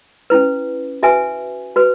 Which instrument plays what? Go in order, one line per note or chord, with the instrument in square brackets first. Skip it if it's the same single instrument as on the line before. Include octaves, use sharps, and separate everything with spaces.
[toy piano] C#4 E4 B4
F#4 B4 E5 G#5
F#4 B4